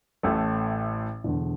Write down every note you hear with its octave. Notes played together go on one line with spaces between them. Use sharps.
A1 A2 A3
E1 E2 D3